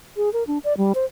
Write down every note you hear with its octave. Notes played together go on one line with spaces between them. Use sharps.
G#4
A#4
D4
D5
G3
C5